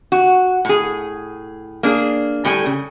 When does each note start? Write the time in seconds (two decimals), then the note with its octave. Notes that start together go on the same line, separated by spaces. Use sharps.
0.12 F#4
0.65 A2 G#4
1.83 A#3 D4 G#4
2.45 A2 G3 A4 G5 G#5
2.66 C#3